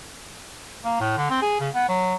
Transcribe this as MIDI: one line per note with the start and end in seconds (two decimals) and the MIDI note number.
0.85 0.98 58
1.00 1.13 45
1.17 1.29 50
1.30 1.40 60
1.42 1.60 68
1.60 1.69 49
1.74 1.87 59
1.89 2.14 54